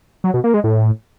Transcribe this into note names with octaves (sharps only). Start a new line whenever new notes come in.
F#3
B2
A#3
G#3
A2